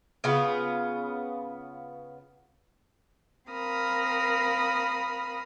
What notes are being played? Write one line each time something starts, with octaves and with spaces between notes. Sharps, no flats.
C#3 B3 F4
C4 A#4 F5 B5 D#6 F6